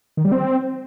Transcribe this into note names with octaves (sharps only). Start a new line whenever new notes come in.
D#3
G3
C4